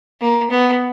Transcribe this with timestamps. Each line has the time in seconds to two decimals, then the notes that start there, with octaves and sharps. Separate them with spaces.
0.21 A#3
0.51 B3